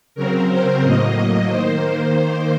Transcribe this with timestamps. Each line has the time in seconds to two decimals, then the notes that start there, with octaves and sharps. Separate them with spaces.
0.15 C#3 F#3 C4 A#4
0.49 C5
0.82 A2 F#3 A#3 D#5
1.49 D#3 A#3 C5